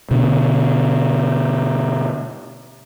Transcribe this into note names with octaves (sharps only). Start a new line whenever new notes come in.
B2 D3